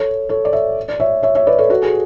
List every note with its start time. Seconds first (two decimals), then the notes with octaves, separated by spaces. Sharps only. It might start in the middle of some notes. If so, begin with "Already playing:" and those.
Already playing: A4 C#5
0.29 A4 C#5
0.45 D5
0.53 C#5 E5
0.88 D5
1.00 C#5 E5
1.23 C#5 E5
1.35 C#5 E5
1.47 B4 D5
1.58 A4 C#5
1.70 F#4 A4
1.82 G#4